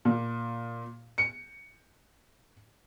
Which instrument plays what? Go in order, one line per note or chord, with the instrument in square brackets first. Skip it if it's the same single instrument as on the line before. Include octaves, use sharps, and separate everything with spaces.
[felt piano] A#2
C#7